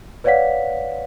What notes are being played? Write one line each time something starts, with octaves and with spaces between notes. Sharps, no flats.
B4 C#5 D5 F5 F#5 B6